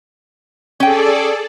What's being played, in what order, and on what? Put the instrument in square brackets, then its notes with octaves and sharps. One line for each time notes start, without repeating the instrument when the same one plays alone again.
[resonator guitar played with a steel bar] C#4 G5 [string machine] G#4 A4 D5